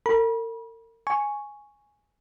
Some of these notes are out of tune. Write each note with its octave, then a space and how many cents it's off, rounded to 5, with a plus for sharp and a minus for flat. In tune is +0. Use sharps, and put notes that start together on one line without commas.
A#4 -40 B5 -40
G#5 +0 C#6 +0